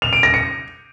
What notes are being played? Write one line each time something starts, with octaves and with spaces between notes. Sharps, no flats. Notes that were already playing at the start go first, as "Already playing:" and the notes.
F7
D7
A#6
C#7